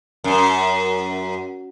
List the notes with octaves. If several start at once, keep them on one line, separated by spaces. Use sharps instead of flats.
F#2